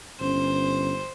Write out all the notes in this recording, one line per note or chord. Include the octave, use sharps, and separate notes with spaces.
G1 C#4 C5